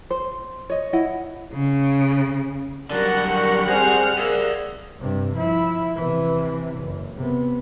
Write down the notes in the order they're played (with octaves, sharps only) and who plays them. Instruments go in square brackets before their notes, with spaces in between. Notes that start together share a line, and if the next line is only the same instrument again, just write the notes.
[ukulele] C5
C#5 D#5
E4 D#5 F#5
[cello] C#3
[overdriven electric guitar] D3 F#3 [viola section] G3 F#5 [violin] A#4 [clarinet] D5
[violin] G4 A#4 [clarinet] C#6
[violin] C4 F6 [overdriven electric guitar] G#4 [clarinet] C5
[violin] A#3 [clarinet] G#4 [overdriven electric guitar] D5 E5
[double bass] G2 C3
F3 E4
C3 E3
F#1
C3 B3